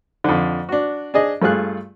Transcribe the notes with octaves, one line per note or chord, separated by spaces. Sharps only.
F2 D3
D4 F#4
D4 G#4 D#5
G2 A3 F4 G#4 F#6